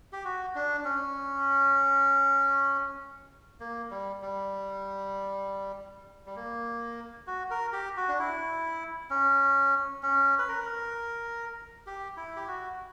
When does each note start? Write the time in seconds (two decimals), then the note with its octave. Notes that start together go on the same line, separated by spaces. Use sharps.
0.13 G4
0.25 F#4
0.55 D4
0.85 C#4
3.60 A#3
3.91 G3
4.22 G3
6.26 G3
6.36 A#3
7.27 F#4
7.51 A#4
7.73 G4
7.97 F#4
8.08 D4
8.19 E4
9.10 C#4
10.03 C#4
10.39 B4
10.49 A#4
11.87 G4
12.17 E4
12.36 G4
12.47 F#4